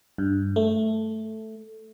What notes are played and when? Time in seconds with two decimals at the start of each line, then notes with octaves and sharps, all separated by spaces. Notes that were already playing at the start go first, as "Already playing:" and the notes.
0.18 G2
0.56 A3